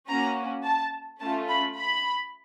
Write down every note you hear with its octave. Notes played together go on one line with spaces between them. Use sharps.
A#3 C#4 F#4 A#5
A5
A3 C#4 F4 A5
B5
B5